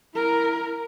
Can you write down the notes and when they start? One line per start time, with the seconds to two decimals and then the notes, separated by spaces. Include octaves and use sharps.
0.14 E4 A#4